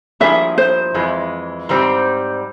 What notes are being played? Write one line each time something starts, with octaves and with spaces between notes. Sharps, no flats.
G2 F3 A#3 E4 G#4 E5
C5
F2 E3 G#3
G#2 G3 C4